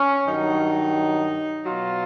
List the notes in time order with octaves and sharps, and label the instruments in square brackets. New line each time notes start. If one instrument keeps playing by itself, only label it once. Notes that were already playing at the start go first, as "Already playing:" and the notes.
Already playing: [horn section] C#4
G2 D#3 F#3 D#4
B2 F#3 F4